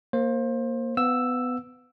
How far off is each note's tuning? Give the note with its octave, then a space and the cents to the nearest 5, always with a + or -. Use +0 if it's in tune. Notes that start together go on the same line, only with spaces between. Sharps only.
A#3 +0 C5 +25
B3 +20 F5 +40 E6 +0